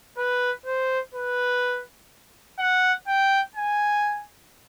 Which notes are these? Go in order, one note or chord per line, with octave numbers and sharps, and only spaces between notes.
B4
C5
B4
F#5
G5
G#5